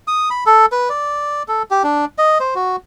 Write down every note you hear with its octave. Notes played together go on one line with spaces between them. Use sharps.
D#6
B5
A4
B4
D5
A4
G4
D4
D#5
C5
F#4